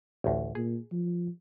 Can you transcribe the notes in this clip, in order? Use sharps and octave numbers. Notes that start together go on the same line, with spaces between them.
A1 D2
A#2 G#4
F3